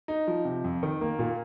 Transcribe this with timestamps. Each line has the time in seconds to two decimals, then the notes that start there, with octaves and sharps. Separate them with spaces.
0.08 D#4
0.27 F3
0.45 C3
0.64 F2
0.83 D#3
1.01 A#3
1.19 A#2